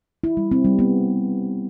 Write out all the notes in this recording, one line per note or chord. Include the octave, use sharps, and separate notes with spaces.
E4
G3
C4
G3
B3